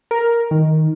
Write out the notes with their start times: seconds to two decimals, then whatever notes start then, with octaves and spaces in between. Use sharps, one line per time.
0.11 A#4
0.51 D#3